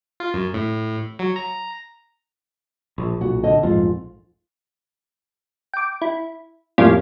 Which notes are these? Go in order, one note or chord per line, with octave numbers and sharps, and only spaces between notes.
F4
F#2
A2
F#3
A#5
A#1
B1 A#2 F#4
D3 D#5
A#1 F2 G#2 F4
G5 D6
E4
F2 A2 G3 A#3 C#4 F4